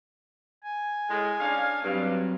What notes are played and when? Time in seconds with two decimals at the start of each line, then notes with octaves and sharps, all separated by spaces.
0.63 G#5
1.09 A2 G#3
1.39 C#4 D4 F5
1.84 G2 F#3 C4